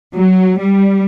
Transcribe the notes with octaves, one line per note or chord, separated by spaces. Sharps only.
F#3
G3